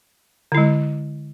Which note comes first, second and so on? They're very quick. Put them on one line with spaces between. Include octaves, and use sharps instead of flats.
D3 E4 G#3